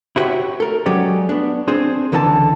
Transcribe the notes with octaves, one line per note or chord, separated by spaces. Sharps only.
E4 F#4 G4 B4 C#5 E5
A4 A#4
F#3 G#3 C#4 G4 D5
B3 D4
C4 D4 G#4 C5
C#2 D3 E3 A4 D5 A5